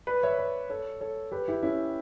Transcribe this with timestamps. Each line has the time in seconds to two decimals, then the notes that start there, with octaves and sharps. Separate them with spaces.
0.07 B4 D5
0.23 C#5 E5
0.38 B4 D5
0.70 A4 C#5
1.01 A4 C#5
1.32 G4 B4
1.48 E4 G4
1.63 C#4 E4